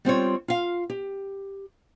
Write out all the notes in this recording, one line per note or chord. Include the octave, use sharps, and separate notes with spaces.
G3 C4 F4 C#5
F4 F5
G4